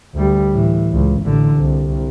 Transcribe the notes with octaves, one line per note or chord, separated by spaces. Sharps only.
D2 G3
A2 E3
C#2
A1 D3
C2